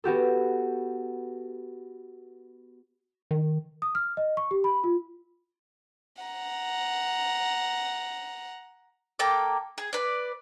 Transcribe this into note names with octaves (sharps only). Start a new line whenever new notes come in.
B3 F#4 G4 A4
D#3
D#6
F6
D#5
C#6
G4
B5
F4
F#5 A#5
A#3 A4 G5 D6
G#4
B4 D5